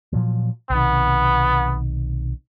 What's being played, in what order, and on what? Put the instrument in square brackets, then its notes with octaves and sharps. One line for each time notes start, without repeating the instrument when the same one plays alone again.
[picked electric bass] A#2 F3 F#3
[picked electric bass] B1 C3 D#3 [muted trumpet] B3